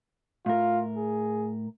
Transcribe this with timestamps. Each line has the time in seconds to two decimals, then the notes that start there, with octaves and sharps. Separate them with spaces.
0.46 A2 F4 A#4
0.97 G#4